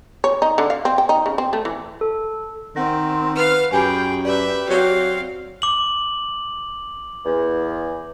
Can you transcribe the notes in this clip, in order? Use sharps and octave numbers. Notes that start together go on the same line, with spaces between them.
C#5
D#4
D3
F5
C4
G5
D#4
C#3
C4
A3
E3
A4
D#3 C4 F#5 A#6
B4 F5 F6
F#2 G4 G#4 G5 G#5 B5
G4 B4 D5 E5
F#3 C4 F5
D6 F#7
E2